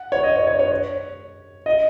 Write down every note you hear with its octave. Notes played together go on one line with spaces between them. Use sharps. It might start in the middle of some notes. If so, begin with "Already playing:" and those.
Already playing: F#5
C#5
D#5
C#5
C#5
C#5
C#5
D#5